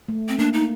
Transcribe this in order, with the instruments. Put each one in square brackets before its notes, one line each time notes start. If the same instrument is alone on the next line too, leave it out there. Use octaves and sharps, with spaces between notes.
[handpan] A3
[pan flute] C4
[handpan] A#3 [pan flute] D4
[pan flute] D#4